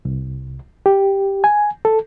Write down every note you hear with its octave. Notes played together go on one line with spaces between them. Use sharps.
C2
G4
G#5
A4